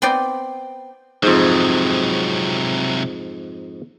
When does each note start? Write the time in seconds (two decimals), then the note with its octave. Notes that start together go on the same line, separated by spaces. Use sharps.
0.02 B3 C4 B4 D5 G5 B5
1.23 F2 G#2 C3 F#3